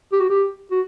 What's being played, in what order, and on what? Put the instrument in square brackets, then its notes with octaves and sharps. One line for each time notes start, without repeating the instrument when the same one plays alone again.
[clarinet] G4
F#4
G4
F#4